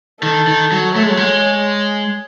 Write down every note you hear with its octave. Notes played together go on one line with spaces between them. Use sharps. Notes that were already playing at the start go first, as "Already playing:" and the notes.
D#3 A4
D#3
F#3
A3 C#5
G#3
F#3
G#3